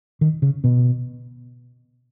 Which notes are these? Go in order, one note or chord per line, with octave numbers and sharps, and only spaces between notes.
D#3
C#3
B2